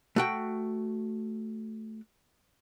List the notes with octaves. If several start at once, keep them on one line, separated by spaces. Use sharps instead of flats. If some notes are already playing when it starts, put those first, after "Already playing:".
A3 F#4 G5